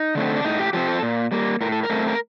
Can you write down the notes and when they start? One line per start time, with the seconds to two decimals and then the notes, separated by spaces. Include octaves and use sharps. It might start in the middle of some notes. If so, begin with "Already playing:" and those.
Already playing: D#4
0.15 D3 A3 C4
0.36 D4
0.45 A2 D#4
0.59 G4
0.73 F3 C4 G4
0.88 A4
1.02 A#2
1.32 G3 A#3
1.61 A2 A#4
1.72 A4
1.83 A#4
1.90 A3 C4
2.07 A#4